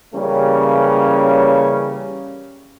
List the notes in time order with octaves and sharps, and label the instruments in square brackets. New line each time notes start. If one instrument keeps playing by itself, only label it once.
[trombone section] C#3 E3 G3 A#3 C#4